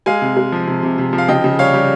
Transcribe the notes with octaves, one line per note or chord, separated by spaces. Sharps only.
G#3 F5 G#5
C3
G#3
F3
C3
C3
C3
F3
F5
C#3 D#5 G5
C#3
G3 C#5 F5
G3